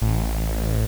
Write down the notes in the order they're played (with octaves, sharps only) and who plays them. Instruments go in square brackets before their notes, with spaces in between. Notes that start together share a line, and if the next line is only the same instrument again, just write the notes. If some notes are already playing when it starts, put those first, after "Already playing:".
[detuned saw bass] A1